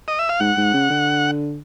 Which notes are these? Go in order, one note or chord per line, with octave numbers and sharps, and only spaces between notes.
D#5
E5
F5
G#2 F#5
G#2
C#3
D3